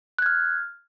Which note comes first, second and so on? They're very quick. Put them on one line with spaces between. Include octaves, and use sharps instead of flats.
F#6 G#6 F6